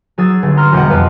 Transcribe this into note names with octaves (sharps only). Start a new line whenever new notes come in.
F#3 G#4 E6 A6
G1
A#5 C6 F6 A#6
E1 B2 G3 G4 D#5 F#5
F2 B4 F5